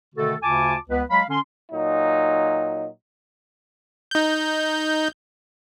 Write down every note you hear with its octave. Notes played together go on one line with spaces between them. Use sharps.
B2 D3 D#3 A3 F#4 A4
D2 C#3 F4 G#5 A5 D6
C#2 B3 B4
F#3 G#3 F5 B5
D3 C#4 C6
A#2 F#3 D#4
D#4 G6